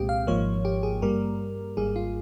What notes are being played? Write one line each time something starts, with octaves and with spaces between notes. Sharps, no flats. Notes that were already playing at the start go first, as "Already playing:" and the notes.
Already playing: C2 A#2 G#3 C4 G4
F5
G#1 G#2 F3 A#3 C#5
G4
G#4
G2 G3 A#3 A#4
G#1 G#2 G3 A#3 G#4
F4